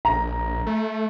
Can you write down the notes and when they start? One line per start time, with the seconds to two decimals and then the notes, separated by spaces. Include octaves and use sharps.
0.05 A#1 A#5
0.66 A3